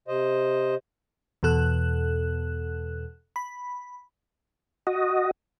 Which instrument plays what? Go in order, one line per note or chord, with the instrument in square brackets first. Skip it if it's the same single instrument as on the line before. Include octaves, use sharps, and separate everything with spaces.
[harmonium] C3 C5 D#5
[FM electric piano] E2 B2 A4 F#6
B5
[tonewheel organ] F#4 D#5